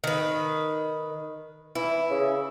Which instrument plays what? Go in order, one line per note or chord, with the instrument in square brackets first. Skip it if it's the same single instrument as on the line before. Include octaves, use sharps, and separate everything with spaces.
[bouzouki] D#3 B4
[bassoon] E3 [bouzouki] E4
[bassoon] C#3